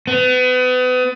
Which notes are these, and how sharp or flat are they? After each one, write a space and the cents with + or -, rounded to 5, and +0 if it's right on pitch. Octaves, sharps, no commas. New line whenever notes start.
B3 +35